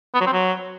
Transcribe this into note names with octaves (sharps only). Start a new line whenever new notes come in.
B3
F#3
C4
F#3